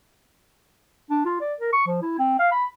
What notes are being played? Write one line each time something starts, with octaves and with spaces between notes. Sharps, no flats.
D4
F4
D5
A#4
C#6
F3
E4
C4
F5
B5